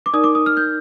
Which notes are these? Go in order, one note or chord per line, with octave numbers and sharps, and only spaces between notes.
D6
D#4 A#4 D5 D#6
D6
D#6
F6
G6